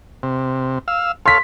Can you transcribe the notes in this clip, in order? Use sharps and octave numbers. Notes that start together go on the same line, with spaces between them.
C3
F5 E6
A4 C#5 F5 C6 B6